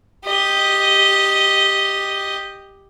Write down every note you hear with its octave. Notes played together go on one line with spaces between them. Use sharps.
G4 D#5